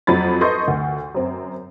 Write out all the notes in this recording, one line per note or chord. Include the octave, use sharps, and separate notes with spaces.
F2 F3 F#3 B5 A6
A4 B4 D#5 C6 C#6 G6
D2
F#2 C4